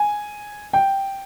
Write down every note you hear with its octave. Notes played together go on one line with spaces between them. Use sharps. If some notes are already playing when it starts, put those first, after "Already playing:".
Already playing: G#5
G5